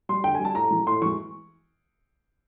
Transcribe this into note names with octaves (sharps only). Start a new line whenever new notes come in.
G3 C6
D3 G5
G#5
G3 A5
A2 A#5
E3 G#3
A2 C6
E3 G#3 C#6